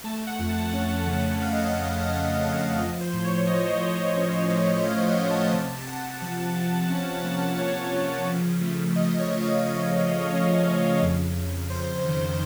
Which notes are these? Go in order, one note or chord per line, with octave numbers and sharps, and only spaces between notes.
A3 A5
F#5
F2
A5
C#4
C#3
A3 F5
D#5
F5
F2
C#4
F2
F3 D#5
C5
A2
C#5
F3 D#5
A2
C#4
A3
A2 F5
F#5
A2
A5
C3 A5
A5
C3 F#5
F3 F#5
A5
F#5
C3
C#4
A#3
C3 C#5
F3
C#3
A3
C#3 D#5
C#5
C#3
F5
C#3 D#5
C#3
C#4 D#5
C#3
F2
F2
F2 C5
D#3